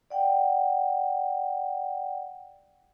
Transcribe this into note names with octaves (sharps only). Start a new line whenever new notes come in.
D5 F#5 G5